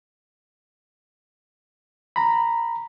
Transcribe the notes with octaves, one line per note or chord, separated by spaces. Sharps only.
A#5 B5